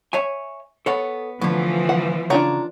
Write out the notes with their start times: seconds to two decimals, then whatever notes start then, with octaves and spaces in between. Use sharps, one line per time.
0.13 C#5 E5 G#5
0.86 B3 A4 C#5 F#5
1.41 A2 D3 E3 F3 B3
1.89 F#5
2.30 C#3 D4 F4 C#5 F#5 A#5